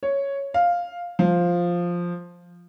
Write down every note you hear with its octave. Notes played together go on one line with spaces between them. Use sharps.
C#5
F5
F3